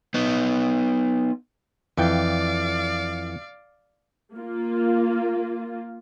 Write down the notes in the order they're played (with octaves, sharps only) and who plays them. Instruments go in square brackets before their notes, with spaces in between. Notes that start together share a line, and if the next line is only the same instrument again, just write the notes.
[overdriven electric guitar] B3 D#4
[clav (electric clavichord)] F2 E3 G5 [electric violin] D5 F5
[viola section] A#3 F4